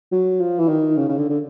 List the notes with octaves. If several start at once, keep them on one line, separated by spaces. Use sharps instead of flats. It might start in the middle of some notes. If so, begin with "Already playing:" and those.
F#3
F3
E3
D#3
C#3
C#3
D3
D3